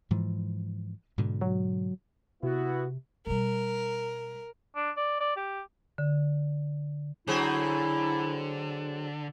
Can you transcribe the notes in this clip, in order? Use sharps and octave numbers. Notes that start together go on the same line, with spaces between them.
G#2 E3 F3
G#2 B2 D3
F#3
C3 B3 E4 F#4
B2 G3 A#4
D4
D5
D5
G4
D3
D3 F#3 C4 E4 G#4